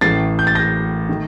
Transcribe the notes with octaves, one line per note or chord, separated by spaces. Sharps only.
A1 A2 A3 A6 C7
G6
A6
G6 A#6
D#3 A3